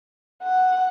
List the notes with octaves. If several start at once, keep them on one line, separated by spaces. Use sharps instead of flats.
F#5